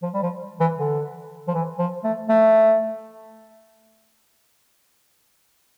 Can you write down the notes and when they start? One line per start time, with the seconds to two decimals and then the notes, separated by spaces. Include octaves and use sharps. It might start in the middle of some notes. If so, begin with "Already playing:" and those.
0.03 F3
0.14 G3
0.22 F3
0.60 E3
0.79 D3
1.48 F3
1.54 E3
1.78 F3
2.04 A3
2.29 A3